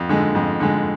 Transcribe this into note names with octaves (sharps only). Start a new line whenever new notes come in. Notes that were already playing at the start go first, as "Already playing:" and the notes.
Already playing: F2
D3 G#3
F2
D3 G#3